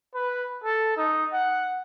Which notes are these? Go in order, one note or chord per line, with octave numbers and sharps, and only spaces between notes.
B4
A4
D#4
F#5